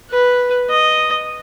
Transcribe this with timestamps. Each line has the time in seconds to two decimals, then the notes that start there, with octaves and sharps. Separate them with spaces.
0.10 B4
0.70 D#5